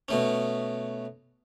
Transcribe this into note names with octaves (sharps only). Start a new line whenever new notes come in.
B2 A3 C#4